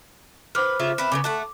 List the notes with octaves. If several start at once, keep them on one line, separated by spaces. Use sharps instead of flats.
B4 C5 D6 F6
C#3 F4 E5
C4 E4 B4
C#3 G#3 B3 D6
A3 F#5 A5